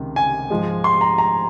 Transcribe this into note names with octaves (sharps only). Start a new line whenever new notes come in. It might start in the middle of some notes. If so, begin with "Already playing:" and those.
Already playing: C#2 C3 D#3
G#5
G#2 F3 G#3
C6
A#5
A#5